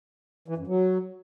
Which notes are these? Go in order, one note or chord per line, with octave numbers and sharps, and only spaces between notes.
E3
F#2
F#3